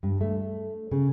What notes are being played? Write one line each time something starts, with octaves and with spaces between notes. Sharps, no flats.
G2
A3
C#3